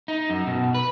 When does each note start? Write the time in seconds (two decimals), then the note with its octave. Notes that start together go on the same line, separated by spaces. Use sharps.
0.08 D#4
0.30 F#2
0.47 B2
0.75 B4